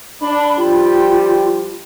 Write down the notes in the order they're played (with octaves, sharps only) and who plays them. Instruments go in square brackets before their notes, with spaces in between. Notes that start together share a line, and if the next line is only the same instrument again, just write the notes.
[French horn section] D4 [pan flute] B5
[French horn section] F3 G3 G4 [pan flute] F4